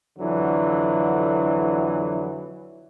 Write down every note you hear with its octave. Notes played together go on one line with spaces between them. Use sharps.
F2 D3 E3 F#3